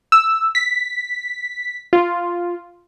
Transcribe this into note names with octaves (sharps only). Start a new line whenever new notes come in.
E6
B6
F4